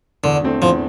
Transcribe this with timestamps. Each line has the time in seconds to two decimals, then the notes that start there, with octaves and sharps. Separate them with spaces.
0.24 E2 D3
0.43 D3 A3 C4
0.62 E2 F3